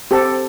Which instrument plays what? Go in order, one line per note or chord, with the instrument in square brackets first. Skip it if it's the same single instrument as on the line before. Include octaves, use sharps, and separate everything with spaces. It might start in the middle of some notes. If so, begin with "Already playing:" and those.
[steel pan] C4 G4 A4